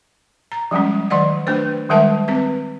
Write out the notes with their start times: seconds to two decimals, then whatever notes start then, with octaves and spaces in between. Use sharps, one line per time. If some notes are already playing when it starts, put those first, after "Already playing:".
0.52 A#5
0.71 F3 G3 G#3 C#4
1.10 D#3 F#3 D5 D#5 F#5
1.47 A3 D4 B4 C5
1.89 D#3 G3 G#3 A#4 E5 A5
2.28 C4 B4